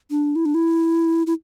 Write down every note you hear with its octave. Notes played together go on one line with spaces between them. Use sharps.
D4
E4
D4
E4
E4